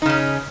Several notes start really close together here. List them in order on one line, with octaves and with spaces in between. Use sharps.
D#4 C#3 C#4